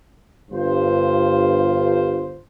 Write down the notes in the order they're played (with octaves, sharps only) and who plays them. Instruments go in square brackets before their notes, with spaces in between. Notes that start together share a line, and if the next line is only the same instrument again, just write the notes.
[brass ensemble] G1 G2 F4 C5